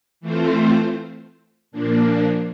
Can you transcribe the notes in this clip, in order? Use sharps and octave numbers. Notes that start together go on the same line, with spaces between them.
E3 A3 C4 F4 C5
A#2 F3 A#3 D4